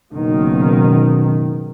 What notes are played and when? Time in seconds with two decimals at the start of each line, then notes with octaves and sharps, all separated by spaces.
0.13 F#1 B2 D#3